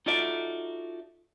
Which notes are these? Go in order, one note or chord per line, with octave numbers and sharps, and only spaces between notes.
D#4 F4 F#4 A4 D5 E5